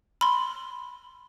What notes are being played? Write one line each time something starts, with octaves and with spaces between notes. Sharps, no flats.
B5 C6